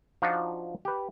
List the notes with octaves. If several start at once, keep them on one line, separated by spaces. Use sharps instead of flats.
F3 D4 D#4 F4 F#4
G4 B4